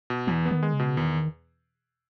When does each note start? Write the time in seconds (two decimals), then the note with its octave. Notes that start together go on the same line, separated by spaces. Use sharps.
0.10 B2
0.27 E2 E3
0.45 B3
0.51 D#3
0.63 G#3
0.73 C#3
0.79 B2
0.97 E2 D#3